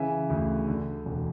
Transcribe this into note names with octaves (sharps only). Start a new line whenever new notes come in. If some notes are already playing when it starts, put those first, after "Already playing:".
Already playing: C#3 E3 E5 G#5
D2
D3
E1